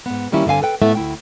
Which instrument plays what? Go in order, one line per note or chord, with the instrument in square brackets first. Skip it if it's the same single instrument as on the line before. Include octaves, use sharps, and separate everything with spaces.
[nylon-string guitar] G#2 B3
D#3 G3 A#3 C#4 E4 G4
G2 D3 C4 F5 G#5
A4 B4 G5
A2 A3 B3 E4 E5
D2 E4 G5